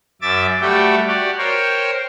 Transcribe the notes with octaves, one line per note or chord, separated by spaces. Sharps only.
F#2 E5 D6 A6
G3 A3 F#4 G4 E5 G5
F#4 G4 D5
A#4 C5 C#5 G5